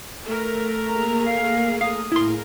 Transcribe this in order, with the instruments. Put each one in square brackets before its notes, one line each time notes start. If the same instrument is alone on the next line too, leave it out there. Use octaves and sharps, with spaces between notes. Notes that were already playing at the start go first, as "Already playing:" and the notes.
[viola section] A3 A#4
[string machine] A#3 G#4 [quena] A#5
[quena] F5
[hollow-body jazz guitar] F5 [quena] D#6
[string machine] A2 G#4 F5 [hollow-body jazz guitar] E4 C6 [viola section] A#4